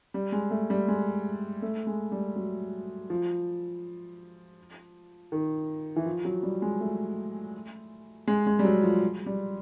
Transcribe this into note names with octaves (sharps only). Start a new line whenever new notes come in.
G3
G#3
A3
G3
G#3
A3
G#3
G3
F#3
F3
D#3
E3
F3
F#3
G3
G#3
A3
G#3
G#3
G3
F#3
F3
G3